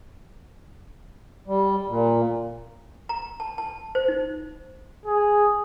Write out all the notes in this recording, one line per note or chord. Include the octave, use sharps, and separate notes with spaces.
G3
A#2
A#5
A5
A5
C5
D#4
G#4